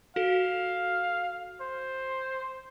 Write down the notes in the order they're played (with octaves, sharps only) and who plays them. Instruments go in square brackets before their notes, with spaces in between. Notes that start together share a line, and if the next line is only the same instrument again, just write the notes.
[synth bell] F#4 A4 [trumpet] F5
[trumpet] C5